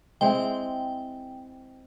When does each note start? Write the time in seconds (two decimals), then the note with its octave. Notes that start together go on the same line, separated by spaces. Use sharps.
0.21 G#3 C4 E4 G5